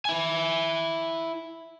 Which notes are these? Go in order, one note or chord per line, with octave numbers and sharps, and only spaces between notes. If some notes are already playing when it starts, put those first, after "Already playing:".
E4 G#5